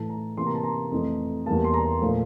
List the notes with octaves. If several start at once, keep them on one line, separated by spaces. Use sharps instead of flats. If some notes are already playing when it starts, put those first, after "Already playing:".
Already playing: A2 E3 A3 A5
A#5
C3 E3 A#3 C6
A#5
A5
A#5
F2 E3 A3
E2 E3 G3 A#3 A5
C6
A#5
A#2 F3 A3